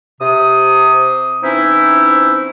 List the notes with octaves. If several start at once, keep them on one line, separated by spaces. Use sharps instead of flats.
C3 D#6
E3 C4 C#4 D#4 E4